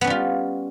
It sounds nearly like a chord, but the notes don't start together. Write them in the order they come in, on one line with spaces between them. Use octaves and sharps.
B3 C#4 G3 F4